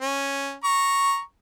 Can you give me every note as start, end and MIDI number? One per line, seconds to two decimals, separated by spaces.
0.01 0.55 61
0.64 1.20 82
0.64 1.20 85